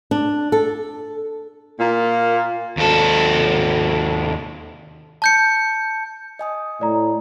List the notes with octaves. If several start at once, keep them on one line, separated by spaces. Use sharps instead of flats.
D4
A4
A#2 A#3
D#2 A4
A5 G6 C#7
D#5 G#5 D#6
A2 D5 A#5